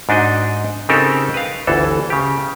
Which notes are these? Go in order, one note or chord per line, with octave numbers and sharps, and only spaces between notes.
G#2 D4 D#4 F#4 D#5
C#3 C4 D#4 G4 A4 A#4
B4 F5
G1 D2 E3 A4
C#3 G4